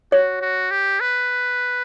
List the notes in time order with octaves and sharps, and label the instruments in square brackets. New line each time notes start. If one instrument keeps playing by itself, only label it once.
[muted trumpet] F#4 [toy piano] C#5
[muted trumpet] F#4
G4
B4